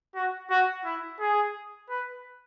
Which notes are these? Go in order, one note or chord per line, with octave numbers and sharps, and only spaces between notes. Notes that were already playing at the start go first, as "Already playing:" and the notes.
F#4
F#4
E4
G#4
B4